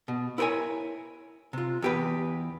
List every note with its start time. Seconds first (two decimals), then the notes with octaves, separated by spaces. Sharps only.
0.08 B2
0.38 E4 A#4 B4 C#5 G#5
1.53 C3 F4
1.82 E2 G4 B4